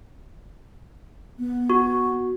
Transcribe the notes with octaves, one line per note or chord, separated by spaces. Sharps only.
B3
F#4